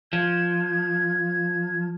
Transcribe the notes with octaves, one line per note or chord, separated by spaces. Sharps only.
F3 G#6